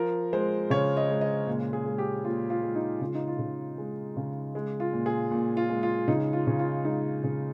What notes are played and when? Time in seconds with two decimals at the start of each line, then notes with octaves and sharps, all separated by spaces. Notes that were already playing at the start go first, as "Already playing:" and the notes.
Already playing: F3 A#4
0.33 G#3 C5
0.70 C#3 C#5
0.97 D#5
1.10 G#3
1.21 D#5
1.47 A#2
1.73 G#4
1.86 G#3
1.98 G4
2.25 A#2 F4
2.50 F4
2.63 G#3
2.75 D#4
3.01 C#3 F4
3.15 D#4
3.28 F4
3.39 C#3
3.78 G#3
4.17 C#3
4.55 G#3
4.80 F4
4.93 A#2
5.06 G#4
5.31 A#2
5.57 F4
5.70 G#3
5.83 F4
6.08 C#3 D#4
6.33 F4
6.47 C#3
6.59 F4
6.85 G#3 D#4
7.24 C#3